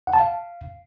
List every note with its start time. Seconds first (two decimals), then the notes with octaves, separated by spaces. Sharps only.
0.07 F#5
0.13 A5
0.20 F5